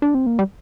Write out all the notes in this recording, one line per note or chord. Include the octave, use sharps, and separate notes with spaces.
D4
C4
A#3
G3